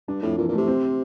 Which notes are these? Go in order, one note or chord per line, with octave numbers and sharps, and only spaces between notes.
G2 D4
F2 A2
A#2 E3
A#2
C3 A3
C4